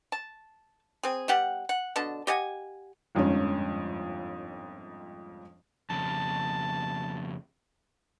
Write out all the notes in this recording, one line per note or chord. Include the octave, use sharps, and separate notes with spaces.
A5
C4 G#4
G3 B3 G4 F#5
F#5
B2 D3 A5
G4 D#5 F#5 G#5
G1 F2 G#2 C#4
F2 C#3 A5